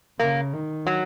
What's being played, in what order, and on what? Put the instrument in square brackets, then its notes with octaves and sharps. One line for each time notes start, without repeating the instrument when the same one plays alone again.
[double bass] C#3 [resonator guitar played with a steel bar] A#3
[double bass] D#3
[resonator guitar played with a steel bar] F#3